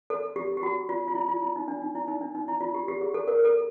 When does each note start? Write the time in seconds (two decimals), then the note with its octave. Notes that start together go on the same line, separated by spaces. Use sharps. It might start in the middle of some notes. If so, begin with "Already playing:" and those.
0.10 A4
0.36 G4
0.57 G4
0.63 F#4
0.89 F4
1.08 F4
1.15 E4
1.29 F4
1.43 E4
1.56 D#4
1.68 D4
1.82 D#4
1.95 E4
2.08 D#4
2.21 D4
2.35 D#4
2.48 E4
2.61 F4
2.74 G4
2.88 G4
3.01 G#4
3.14 A4
3.28 A#4
3.45 A4